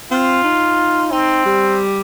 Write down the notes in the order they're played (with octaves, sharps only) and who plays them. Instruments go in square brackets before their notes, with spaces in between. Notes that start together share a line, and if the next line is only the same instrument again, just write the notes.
[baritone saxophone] C4 [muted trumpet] F4
[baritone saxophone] D#4
[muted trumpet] C4 [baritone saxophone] D#4
[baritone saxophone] G3